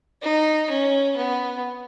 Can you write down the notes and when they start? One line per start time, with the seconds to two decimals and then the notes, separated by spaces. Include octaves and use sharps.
0.22 D#4
0.70 C#4
1.16 B3